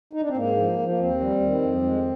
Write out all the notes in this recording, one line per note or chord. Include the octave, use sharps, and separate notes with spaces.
D#4
D4
C4
G#2 A#3
F3
F3
A#3
D#2 C4
G3
D#3
F2
G#3